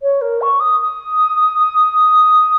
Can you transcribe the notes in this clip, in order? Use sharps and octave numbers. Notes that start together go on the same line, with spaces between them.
C#5
A#4
C#6
D#6
D#6